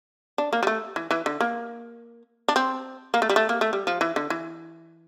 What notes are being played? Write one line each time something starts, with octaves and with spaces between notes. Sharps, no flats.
D4
A#3
G3
A3
E3
E3
D3
A#3
D4
C4
A#3
A3
G3
A3
A#3
A3
G3
F3
E3
D3
E3